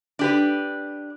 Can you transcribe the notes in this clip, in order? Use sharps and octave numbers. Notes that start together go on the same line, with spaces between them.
D4 G4 B4